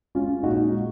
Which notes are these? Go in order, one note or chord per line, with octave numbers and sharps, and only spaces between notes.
G#3 C#4 F4
A#2 D#4 F#4
G#3